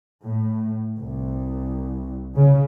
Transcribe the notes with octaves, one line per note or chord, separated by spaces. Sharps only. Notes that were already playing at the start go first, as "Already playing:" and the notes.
A2
C2
C#3